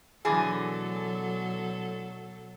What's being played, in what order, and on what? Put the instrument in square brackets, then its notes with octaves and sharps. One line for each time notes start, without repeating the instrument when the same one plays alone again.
[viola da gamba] B2 F#3 A4 [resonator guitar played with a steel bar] D3 E3 G#4